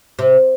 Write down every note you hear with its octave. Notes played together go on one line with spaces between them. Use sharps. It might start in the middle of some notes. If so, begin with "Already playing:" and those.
C3